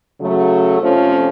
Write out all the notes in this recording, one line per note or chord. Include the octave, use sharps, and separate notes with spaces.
C#3 F#3 A3
F2 C3 F3 A3 C#4